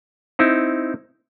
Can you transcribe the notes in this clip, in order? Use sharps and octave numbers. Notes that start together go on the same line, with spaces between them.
C4 D#4 E4